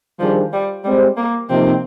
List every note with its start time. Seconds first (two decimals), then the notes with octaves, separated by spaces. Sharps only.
0.19 D#3 F3 G3 D4 G#4 C5
0.53 G3
0.84 G3 G#3 C4 G4 C5
1.17 A#3
1.50 C3 F3 A#3 C4 D#4